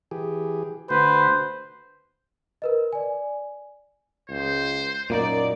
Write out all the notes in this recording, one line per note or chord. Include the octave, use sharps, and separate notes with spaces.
E3 G4 G#4
D3 A3 F#4 B4 C5
A#4 B4 D#5
D5 G#5
C#2 C5
F#2 A#2 A#3 D#4 D5